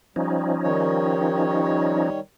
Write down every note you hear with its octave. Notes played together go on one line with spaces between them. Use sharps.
F3 G3 C#4 D#4
D#3 G3 C#5